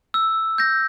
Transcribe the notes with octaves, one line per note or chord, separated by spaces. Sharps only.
E6
G6 A#6